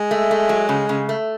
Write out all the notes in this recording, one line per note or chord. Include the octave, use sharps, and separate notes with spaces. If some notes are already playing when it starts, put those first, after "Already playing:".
Already playing: G#3
A3
A3
F#3
C#3
C#3
A3